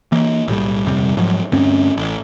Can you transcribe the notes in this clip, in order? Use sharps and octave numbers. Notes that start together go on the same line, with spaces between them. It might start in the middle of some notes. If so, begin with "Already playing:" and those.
E3 A#3
B1 A2 F3 G3
D#1 F2 C3 G3
G#2 F3 F#3
D2 G2 C4 C#4
A1